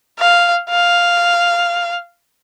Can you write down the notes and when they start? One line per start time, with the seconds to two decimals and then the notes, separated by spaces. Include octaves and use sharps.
0.19 F5
0.70 F5